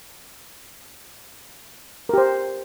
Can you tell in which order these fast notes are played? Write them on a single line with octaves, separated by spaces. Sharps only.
A#4 G4 C5